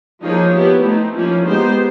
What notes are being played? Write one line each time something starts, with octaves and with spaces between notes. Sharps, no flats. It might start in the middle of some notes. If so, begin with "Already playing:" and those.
F3 A#3 D#4 G#4 C#5
B3 E4 G4
A3 C4 D#4
F3 A#3 C#4 E4
G#3 B3 D#4 G4 C5